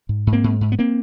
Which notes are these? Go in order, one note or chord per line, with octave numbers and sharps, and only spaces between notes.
G#2
G#2
A#3 C4
G#2
G#2
B3
A#3 C4